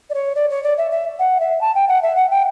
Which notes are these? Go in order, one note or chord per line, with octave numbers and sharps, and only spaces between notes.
D5
C#5
D5
C#5
D5
E5
E5
F#5
E5
A5
G5
F#5
E5
F#5
G5